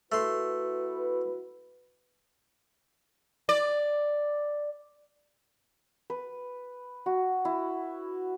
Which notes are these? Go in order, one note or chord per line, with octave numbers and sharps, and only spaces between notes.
A3 E4 F#4 B4 C6
D5
B4
F#4
E4